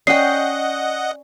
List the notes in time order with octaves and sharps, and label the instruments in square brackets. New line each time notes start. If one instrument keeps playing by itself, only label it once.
[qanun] C#4 G5 [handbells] D5 [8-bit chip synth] D#5 F#5 [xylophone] C7